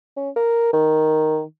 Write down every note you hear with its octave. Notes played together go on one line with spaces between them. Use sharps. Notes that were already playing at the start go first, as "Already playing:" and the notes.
C#4
A#4
D#3